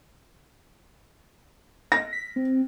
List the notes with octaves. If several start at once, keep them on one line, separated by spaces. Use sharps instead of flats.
A#6
B6
C4